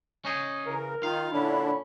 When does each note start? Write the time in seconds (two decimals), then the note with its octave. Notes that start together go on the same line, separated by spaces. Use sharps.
0.25 C#4 D#4 G#4
0.66 C#3 E3 A#4
1.03 D#3 D#4 F4 F5
1.31 A#2 D3 C#4 D4 E4 B5